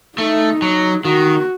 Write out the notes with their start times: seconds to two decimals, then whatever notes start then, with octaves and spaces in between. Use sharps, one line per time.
0.18 A3 D#4
0.62 F#3
1.05 D#3 F#4